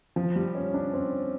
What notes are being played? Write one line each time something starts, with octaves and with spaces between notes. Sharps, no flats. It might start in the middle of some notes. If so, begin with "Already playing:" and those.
F3
G3
C#4
D4
C4